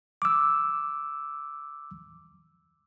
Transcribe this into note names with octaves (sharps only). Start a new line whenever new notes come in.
D6 E6